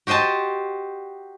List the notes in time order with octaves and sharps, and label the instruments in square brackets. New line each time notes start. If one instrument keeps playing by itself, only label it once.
[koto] F#4 G4 C5 D#5 A5